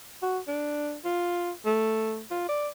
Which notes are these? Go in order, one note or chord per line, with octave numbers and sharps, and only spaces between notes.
F#4
D4
F4
A3
F4
D5